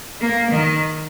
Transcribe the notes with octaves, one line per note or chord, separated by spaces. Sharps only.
A#3
D#3